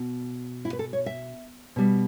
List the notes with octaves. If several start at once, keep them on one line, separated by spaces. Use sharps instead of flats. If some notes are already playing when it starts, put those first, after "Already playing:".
Already playing: B2
E4
B4
A4
C#5
E5
B2 G3